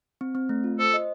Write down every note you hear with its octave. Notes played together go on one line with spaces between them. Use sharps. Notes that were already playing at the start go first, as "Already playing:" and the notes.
C4
C4
A3
F4
A4 C5
D#5